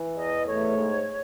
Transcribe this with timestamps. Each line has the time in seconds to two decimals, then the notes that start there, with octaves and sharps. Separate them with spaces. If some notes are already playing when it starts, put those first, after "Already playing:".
Already playing: E3
0.16 E2 D#5
0.46 A3 C#5
0.76 G#2